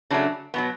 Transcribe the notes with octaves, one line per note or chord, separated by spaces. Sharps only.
C#3 F#3 A3 D4
B2 F#3 B3